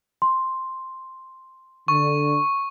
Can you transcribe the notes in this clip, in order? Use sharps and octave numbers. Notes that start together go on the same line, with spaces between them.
C6
D3 C#6